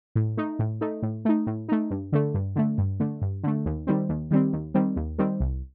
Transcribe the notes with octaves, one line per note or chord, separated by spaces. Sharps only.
A2
A3 D#4
A2
A3 D#4
A2
A3 D#4
A2
A3 D#4
G2
D3 A3
G2
D3 A3
G2
D3 A3
G2
D3 A3
D#2
D#3 G3 C4
D#2
D#3 G3 C4
D#2
D#3 G3 C4
D#2
D#3 G3 C4
C2